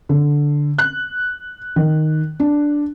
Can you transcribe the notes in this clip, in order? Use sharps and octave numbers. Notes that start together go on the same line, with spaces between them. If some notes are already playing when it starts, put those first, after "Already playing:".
D3
F#6
D#3
D4